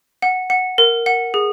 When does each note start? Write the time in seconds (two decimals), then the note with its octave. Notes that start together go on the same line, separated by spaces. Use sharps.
0.22 F#5
0.50 F#5
0.78 A#4
1.06 F#5
1.34 G#4